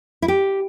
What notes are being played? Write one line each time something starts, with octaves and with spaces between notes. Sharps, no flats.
E4
G4